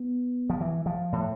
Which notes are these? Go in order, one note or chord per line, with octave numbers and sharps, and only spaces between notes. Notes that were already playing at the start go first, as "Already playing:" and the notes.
Already playing: B3
F3
E3
F3
A2